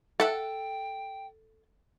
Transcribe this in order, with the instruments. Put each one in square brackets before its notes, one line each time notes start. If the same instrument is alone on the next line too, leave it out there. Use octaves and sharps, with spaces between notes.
[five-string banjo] A4 [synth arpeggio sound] E5 F#5 [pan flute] G5